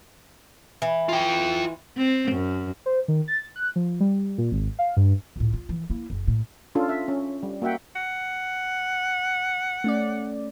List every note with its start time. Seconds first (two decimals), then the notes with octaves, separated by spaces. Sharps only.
0.82 E3
1.09 F4 G5
1.98 C4
2.32 F#2
2.86 C5
3.08 D#3
3.28 A6
3.56 F#6
3.76 F3
4.00 G3
4.38 A#2
4.52 G#1
4.79 F5
4.97 G2
5.36 C#2 A2
5.54 F4
5.69 E3
5.90 A#3 E4
6.10 F#1
6.28 A2
6.75 C#4 D4 F4 A4
6.89 E5
7.08 C#4
7.43 G3
7.62 A#3 F#4 E5 F#5 G5
7.96 F#5
9.84 A3 C#4 D5